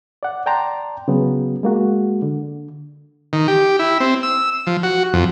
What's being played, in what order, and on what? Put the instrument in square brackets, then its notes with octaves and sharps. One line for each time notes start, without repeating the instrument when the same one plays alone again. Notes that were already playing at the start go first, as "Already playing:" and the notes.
[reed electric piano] D5 F#5
D5 G5 A5 A#5 C6
C#3 F#3 B3
G#3 A#3 F#4
D3
[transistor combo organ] D#3
G4
E4
C4
E6
F3
F#4
F2